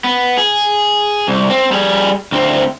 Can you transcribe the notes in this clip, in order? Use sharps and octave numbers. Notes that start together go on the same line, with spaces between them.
B3
G#4
C2
C4
G3 G#4
D2 C4